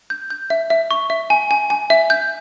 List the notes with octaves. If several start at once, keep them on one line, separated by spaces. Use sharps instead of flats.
G6
G6
E5
E5
C#6
E5
G#5
G#5
G#5
E5
G6